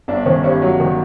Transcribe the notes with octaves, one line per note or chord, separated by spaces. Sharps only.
G1 D4
D#3 C#4
G2 C#4
F#3
D#3